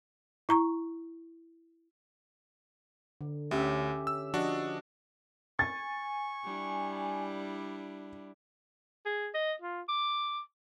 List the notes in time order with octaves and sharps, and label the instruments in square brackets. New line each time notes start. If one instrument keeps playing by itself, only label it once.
[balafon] E4 A#5 C#6
[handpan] D3
[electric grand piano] D2 [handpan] C#4 G4 E5
[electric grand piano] E6
[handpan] F3 D#5 [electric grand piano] D4 F#4
[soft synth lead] G#5 [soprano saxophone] C#6 [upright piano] A6
[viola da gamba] G3 D4 E4
[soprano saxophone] G#4
D#5
F4
D6